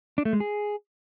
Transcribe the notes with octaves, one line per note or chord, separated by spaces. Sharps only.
D4
A3
G#3
G#4